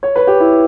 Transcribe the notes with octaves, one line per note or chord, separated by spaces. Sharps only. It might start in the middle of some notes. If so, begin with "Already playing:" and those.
C#5
B4
G4
E4